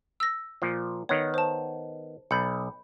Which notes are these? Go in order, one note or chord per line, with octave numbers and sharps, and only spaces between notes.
E6 A#6
A#2 F3
D#3 B3 C#5
C5 A5
B1 B5 G6 C#7